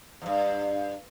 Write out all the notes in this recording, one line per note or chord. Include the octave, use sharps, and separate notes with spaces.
E2 G2